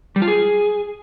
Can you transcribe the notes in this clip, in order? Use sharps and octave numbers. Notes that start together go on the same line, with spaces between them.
G3
F4
G#4